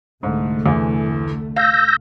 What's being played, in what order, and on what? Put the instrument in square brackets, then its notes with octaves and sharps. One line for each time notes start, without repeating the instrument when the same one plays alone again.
[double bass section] C2 D3 A3 [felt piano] G#2
[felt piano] E2 E3
[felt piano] F5 [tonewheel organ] E6 G6 A#6